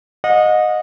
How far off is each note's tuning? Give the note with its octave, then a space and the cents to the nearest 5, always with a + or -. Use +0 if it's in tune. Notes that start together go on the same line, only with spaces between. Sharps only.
D#5 -10 F#5 -40